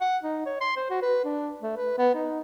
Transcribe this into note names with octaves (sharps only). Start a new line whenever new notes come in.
F#5
D#4
C#5
C6
C5
F#4
B4
D4
A3
B4
B3
D#4